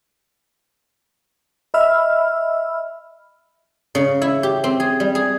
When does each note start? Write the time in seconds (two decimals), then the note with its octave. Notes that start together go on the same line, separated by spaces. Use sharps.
1.74 D#5 E5 B5 E6 F6
3.95 C#3
4.22 E4
4.43 G4
4.64 C4
4.80 G#4
5.00 G3
5.15 G#4